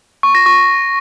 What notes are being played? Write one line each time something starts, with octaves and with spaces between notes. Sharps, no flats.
C#6
A#6
C#6